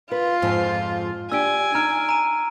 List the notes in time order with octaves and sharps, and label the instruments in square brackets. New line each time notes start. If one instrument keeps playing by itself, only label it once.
[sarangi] F4 [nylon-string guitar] B4
[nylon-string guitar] F2 G#2 F3
[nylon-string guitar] D4 G4 [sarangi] G#5 [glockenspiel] E6 D7
[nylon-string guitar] D#4 [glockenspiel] A#5 F6 D7
[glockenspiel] A#5 D#7